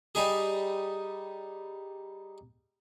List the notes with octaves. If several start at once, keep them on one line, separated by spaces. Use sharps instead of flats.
G3 D#4 G#4